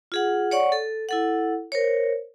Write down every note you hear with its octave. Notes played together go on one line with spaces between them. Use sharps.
F4 G#4 F#5
C#5 D5 F#5 C#6
A4
E4 A4 F#5
A#4 C5 C#5